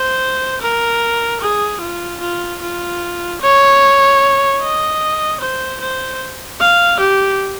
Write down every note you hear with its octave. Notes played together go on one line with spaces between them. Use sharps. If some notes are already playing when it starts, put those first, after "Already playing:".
Already playing: C5
A#4
G#4
F4
F4
F4
C#5
D#5
C5
C5
F5
G4